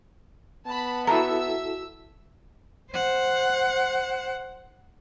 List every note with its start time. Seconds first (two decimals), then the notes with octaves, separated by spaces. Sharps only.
0.66 B3 A5 B5
1.07 E4 F#4 A4 E5 A#5 E6
2.92 C5 F#5